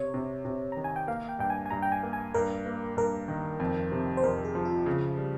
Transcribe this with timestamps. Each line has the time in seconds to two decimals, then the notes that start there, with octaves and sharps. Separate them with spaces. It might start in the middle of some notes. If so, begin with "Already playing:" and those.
Already playing: C3 C#5
0.14 C3
0.45 C3
0.72 D#3 A#5
0.84 G#5
0.96 G5
1.07 A#3 F5
1.29 G5
1.39 G2 G5
1.50 G#5
1.66 G#5
1.71 G2 A#5
1.83 G5
1.92 G#5
2.03 A#3
2.13 G#5
2.34 G2 A#4
2.66 A#3
2.97 G2 A#4
3.28 D#3
3.60 F2
3.92 C3
4.17 C5
4.24 F2 A#4
4.45 G#4
4.55 F3
4.65 F4
4.86 C#3
5.18 G3